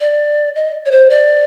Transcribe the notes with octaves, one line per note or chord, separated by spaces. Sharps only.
D5
D#5
C#5
C5
D5